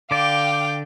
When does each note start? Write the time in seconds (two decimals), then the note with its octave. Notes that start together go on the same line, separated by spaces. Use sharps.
0.11 D3 D5 F5 G5 D6